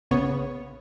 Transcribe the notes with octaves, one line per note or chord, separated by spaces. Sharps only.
A#1 C#3 B3 C#5